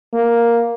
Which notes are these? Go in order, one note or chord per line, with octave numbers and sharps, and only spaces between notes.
A#3